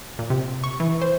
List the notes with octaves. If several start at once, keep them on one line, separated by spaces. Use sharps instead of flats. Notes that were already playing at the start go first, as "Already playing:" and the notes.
A#2
C3
C#6
E3
C5